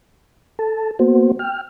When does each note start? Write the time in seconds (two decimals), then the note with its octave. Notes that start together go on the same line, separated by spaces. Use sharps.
0.59 A4 A5
0.99 A#3 B3 F#4 C5
1.39 G5 F6